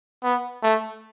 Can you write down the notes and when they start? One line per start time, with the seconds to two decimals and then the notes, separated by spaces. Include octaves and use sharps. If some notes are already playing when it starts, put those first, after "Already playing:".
0.24 B3
0.63 A3